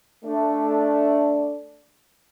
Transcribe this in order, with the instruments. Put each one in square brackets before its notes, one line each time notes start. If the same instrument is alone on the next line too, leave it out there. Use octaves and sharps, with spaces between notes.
[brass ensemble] A3 D4